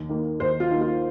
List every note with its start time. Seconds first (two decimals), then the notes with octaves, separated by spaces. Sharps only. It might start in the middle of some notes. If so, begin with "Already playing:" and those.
Already playing: D#2
0.09 D#3 A#3
0.40 D#2 C5
0.60 F4
0.71 D#3 A#3
0.81 F4